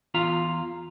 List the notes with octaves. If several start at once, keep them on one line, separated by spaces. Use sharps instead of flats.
E2 F4 F5 A#5